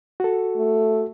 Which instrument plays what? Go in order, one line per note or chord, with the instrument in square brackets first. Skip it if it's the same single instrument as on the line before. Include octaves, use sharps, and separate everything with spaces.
[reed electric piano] F#4 A4
[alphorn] A3